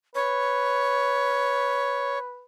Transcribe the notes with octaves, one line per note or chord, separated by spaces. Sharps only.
B4 C#5